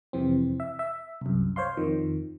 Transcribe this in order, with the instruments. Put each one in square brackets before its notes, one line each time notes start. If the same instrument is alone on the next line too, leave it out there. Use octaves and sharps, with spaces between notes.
[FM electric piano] F2 C3 E3 C4
E5
E5
C2 F#2
C5 C#5 F5 C6
F2 D#3 F3